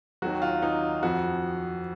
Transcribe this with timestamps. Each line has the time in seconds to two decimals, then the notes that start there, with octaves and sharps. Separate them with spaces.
0.22 D#2 D#3 F#3 F#4
0.42 F4
0.62 D#4
1.03 F2 F3 F#4